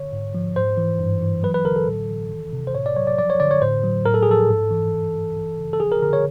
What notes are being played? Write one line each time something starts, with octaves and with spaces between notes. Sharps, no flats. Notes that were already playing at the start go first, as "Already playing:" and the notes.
Already playing: D3 C#5
G#2
F3
G#2 C5
E3
G2
E3
F#3 B4
B4
D3 A#4
A4
A2
E3
D#3
C3
C5
A2 C#5
D5
F#3 C#5
D5
F3 D5
C#5
D3 D5
C#5
A2 C5
F#3
A2 A#4
A4
G#4
F3 A4
G#2
E3
G2
E3
E3
C#3
A4
F3 G#4
A#4
D3 A#4
C#5